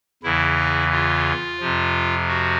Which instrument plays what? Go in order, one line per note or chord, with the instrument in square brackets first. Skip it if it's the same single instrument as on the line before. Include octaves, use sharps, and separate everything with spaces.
[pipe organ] E2 C#3 E3 E4
F4
F2 C3 F3
F#4